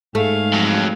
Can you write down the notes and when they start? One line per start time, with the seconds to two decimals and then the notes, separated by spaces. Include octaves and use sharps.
0.15 G#2 A3 G#4 F5
0.53 F2 F#3